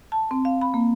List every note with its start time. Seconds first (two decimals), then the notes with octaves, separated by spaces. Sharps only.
0.12 A5
0.31 C4
0.45 F5
0.61 B5
0.74 A#3